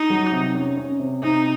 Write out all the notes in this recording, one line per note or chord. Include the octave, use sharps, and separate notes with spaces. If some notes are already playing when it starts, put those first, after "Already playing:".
Already playing: D#4
F#3
C3
C#4
C#4
C3
C3 D#4